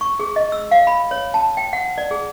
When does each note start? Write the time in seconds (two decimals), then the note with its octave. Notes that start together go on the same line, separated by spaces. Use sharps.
0.01 C#6
0.19 G#4
0.36 D#5
0.52 E6
0.71 F5
0.87 B5
1.11 C#5
1.34 A5
1.57 G5
1.73 F#5
1.98 D5
2.11 G#4